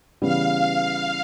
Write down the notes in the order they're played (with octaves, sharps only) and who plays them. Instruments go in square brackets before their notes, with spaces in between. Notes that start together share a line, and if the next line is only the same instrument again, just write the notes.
[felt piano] C#3 E3 G3 B3 [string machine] F5